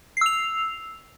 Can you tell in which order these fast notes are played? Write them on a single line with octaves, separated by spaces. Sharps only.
C7 E6 F7